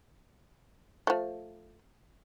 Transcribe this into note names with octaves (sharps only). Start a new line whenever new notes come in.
F3 A3